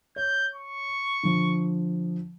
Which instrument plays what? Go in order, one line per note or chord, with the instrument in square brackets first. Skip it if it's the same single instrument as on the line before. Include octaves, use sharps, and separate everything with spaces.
[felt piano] C#5 [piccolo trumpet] G6
[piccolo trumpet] C#6
[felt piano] D3 F3